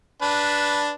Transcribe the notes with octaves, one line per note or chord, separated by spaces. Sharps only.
D4 B4 A5